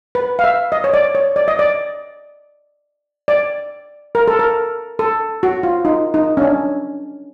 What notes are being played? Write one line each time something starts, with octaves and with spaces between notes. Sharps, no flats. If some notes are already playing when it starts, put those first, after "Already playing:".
B4
F5
E5
D#5
C#5
D5
C#5
D5
D#5
D5
D5
A#4
A4
A#4
A4
F#4
F4
D#4
D#4
C#4
D4